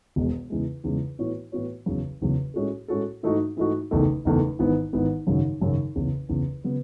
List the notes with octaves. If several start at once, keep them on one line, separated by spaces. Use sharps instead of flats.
E1 E2 B2 G#3
E2 C#3 E3 G#3
E2 C#3 E3 G#3
A2 E3 B3 F#4 C#5
A2 E3 B3 F#4 C#5
F#1 E2 C#3 F#3
F#1 E2 C#3 F#3
A2 G#3 C#4 F#4 A4
A2 G#3 C#4 F#4 A4
G#2 E3 A3 D#4 F#4
G#2 E3 A3 D#4 F#4
F#1 E2 D#3 A3
F#1 E2 D#3 A3
G#1 G#2 E3 B3
G#1 G#2 E3 B3
G#1 F#2 C#3 F#3
G#1 F#2 C#3 F#3
F#1 E2 C#3
F#1 E2 C#3
C#3 F#3 B3